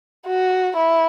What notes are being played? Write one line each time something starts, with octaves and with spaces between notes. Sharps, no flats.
F#4
E4